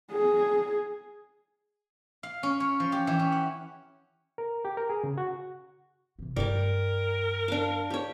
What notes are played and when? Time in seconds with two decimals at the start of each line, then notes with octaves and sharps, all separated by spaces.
0.12 G#4
2.23 F5
2.43 C#4
2.60 C#5
2.80 F3
2.92 G4
3.07 E3
3.19 C#4
3.32 F#5
4.38 A#4
4.65 G4
4.77 A#4
4.90 G#4
5.04 C#3
5.18 F#4
6.19 C3 E3
6.36 G2 G3 A3 A#4 D5
7.48 D4 F5
7.90 G4 C#5